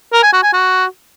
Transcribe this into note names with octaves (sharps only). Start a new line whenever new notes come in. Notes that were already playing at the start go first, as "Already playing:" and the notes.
A#4
G#5
F#4
G#5
F#4